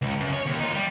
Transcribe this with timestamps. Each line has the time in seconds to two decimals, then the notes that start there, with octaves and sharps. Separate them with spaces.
0.02 C#2
0.20 F#2
0.33 C#5
0.46 D#2
0.59 D#4 F4
0.75 G3